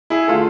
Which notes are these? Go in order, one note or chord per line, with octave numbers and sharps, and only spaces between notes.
E4 G#4
D3 A3 F4 A4